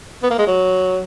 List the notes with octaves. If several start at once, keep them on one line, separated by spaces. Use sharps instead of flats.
B3
A#3
G#3
F#3